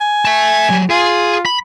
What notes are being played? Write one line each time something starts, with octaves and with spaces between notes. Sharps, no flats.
G#5
E5 A5
F#3 G3
F4 G#4 G#5
B5